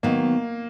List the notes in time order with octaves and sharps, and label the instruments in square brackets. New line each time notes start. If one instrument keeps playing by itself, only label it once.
[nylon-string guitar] D#3 F#3 B3 [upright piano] A#3